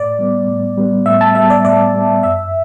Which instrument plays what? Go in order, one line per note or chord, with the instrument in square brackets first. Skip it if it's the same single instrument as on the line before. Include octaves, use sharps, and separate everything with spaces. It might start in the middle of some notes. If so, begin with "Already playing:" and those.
Already playing: [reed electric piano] A2 [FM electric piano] D5
[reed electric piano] G3 B3
A2
G3 B3
[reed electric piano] A2 [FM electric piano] E5
[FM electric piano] A5
[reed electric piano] G3 B3 [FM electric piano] E5
[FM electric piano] D5
[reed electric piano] A2 [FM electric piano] D5
[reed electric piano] G3 B3
[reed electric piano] F#2 [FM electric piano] E5